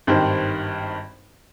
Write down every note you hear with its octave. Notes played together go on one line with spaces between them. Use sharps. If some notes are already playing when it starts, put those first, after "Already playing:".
G#1 G2 D#3 G4 C5